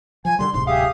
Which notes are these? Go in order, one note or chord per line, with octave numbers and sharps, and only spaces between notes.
F3 G#5
D3 G3 C6
D1 G#2 C3 C6
G4 G#4 E5 F5 D#6